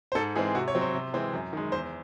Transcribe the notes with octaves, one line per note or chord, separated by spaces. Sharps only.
C5
G#2 A4
E3 G#3 C4 G#4
C3 F#4
C#5
F#3 C4
C5
C3
E3 G#3 C4
F#2
D#3 G#3
E2 C5